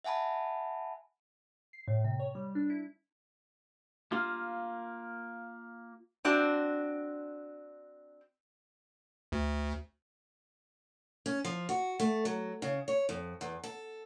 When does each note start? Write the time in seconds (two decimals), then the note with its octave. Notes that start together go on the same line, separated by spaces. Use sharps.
0.04 E5 F#5 G#5 A5 B5
1.73 C7
1.88 A2
2.04 C3
2.19 C#5
2.35 G3
2.55 D4
2.70 E4
4.12 A#3 F4
6.25 C4 D4 F#4
9.32 D2
11.26 C#4
11.45 F3
11.69 F#4
12.00 A3
12.25 F#3
12.62 C#3
12.88 C#5
13.09 F2
13.41 E2
13.64 A4